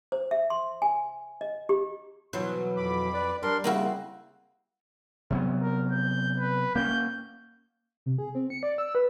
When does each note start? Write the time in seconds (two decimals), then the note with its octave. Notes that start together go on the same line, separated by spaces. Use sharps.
0.12 C5
0.31 E5
0.50 C6
0.82 G#5
1.41 D#5
1.69 G4
2.33 B2 E3 F#3 C5
2.77 F2 B5 D6
3.14 B4 D5
3.43 G3 D4 A#4 C6
3.64 C#3 A#3 C4 E4 F#4
5.30 C3 F#3 B3
5.62 A#4
5.92 G6
6.39 B4
6.76 A#3 B3 C#4 G6
8.06 C3
8.18 G#4
8.35 C4
8.50 C#7
8.63 D5
8.78 E6
8.95 B4